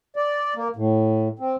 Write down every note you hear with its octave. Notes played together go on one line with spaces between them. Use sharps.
D5
A#3
A2
C4